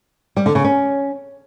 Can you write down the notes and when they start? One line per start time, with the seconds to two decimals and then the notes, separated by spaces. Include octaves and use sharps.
0.37 G3
0.46 D3
0.55 C#3
0.64 C#4